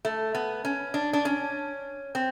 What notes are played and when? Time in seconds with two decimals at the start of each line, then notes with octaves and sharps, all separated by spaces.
0.05 A3
0.35 B3
0.65 C#4
0.94 D4
1.13 D4
1.25 C#4
2.15 C4